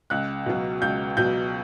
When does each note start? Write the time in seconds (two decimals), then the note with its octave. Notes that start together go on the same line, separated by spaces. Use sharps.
0.10 C#2 F#6
0.46 B2 F#3
0.82 C#2 G6
1.17 B2 F#3 G6